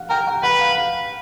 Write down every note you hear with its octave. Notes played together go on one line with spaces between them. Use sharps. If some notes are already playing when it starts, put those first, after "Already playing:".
Already playing: F5 F#5
A#4 G5
F#5
B4 F#5
F5
F5